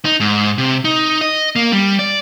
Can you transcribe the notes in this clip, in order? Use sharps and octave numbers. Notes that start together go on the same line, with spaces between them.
D#4
G#2
C3
D#4
D#5
A#3
G3
D5